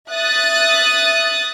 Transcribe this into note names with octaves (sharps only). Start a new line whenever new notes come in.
E5 D#6 F#6 A6